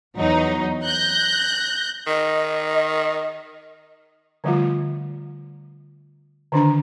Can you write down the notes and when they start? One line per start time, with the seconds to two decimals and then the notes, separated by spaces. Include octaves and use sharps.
0.18 E2 F#3 D#4
0.84 F#6 G6 A#6
2.07 D#3 D#5
4.44 D3 F3 G3 A3 F4
6.52 D3 D#3 D4 A#5